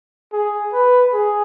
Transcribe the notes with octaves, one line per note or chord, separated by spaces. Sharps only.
G#4
B4
G#4